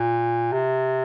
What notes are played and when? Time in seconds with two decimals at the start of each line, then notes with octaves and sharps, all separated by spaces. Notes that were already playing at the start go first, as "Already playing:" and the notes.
Already playing: A#2
0.52 C3